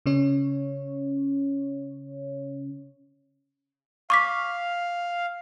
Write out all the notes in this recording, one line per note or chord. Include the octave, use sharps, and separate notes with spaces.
C#3 C#4 C#5
F5 C#6 D6 B6